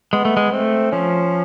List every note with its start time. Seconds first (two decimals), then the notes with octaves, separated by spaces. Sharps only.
0.13 G#3 B3
0.25 A3
0.37 G#3
0.52 A3 C4
0.92 F3 C#4